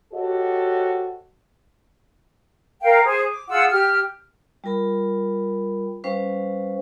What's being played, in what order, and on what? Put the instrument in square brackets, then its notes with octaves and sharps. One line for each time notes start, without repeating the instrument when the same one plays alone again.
[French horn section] F#4 G4 A4 C5 C#5 D#5
[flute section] A#4 F5 G5
G#4 C5
D6
F4 G#4 F#5 E6
G4 F6
[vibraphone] G3 F4 A#4 B5
G3 C#4 B4 C5 F5